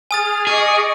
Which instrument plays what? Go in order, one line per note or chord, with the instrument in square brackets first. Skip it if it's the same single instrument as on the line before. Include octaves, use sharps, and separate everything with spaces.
[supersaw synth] G#4 F6 [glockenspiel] G#5 D#6 A6
[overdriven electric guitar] G#4 [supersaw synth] D#5 C#6 D6